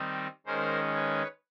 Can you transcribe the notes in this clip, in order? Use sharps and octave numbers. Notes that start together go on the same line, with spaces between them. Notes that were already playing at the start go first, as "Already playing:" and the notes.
Already playing: D#3 G3 C4 D#4
D#3 G#3 C#4 A#4 C5
B4 C#5